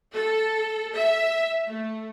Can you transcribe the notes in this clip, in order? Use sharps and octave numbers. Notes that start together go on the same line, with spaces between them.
A4
E5
A3